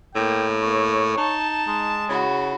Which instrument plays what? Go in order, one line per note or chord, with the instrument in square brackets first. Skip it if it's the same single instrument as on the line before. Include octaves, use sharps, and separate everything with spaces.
[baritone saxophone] A2 [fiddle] A#3 [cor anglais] G5
[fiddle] A#3 [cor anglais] C#5
[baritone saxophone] D#4 [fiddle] A5
[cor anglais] G#3
[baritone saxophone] C#3 [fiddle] E4 F#4